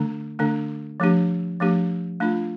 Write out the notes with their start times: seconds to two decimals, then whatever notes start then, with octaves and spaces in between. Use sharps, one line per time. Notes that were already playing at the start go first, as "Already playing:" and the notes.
Already playing: D3 A3 D4
0.39 D3 A3 D4
1.00 F3 A3 D4 G4
1.60 F3 A3 D4 G4
2.20 A3 D4 F4